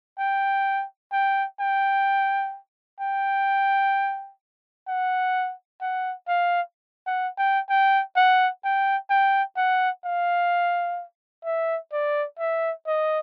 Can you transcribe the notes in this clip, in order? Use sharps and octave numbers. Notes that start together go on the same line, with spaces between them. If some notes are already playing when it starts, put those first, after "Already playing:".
G5
G5
G5
G5
F#5
F#5
F5
F#5
G5
G5
F#5
G5
G5
F#5
F5
E5
D5
E5
D#5